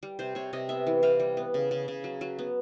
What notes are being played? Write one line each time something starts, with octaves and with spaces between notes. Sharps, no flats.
G3
C3 C5
C3 C#5
C3 D#5
B3 E5
E3
C3 F5
G3
B3
C#3
C#3
C#3
F#3
F#3
B3